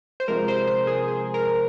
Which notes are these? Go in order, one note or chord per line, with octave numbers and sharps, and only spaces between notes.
C5
C3 F3 G#3 A#4
C5
C5
G#4
G#4
A#4